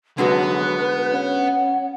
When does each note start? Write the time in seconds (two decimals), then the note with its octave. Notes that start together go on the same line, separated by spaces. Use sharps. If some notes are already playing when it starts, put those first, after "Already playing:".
0.18 F2 D3 F#3 G#3 B3 F#4 B4
1.12 C#4 F#5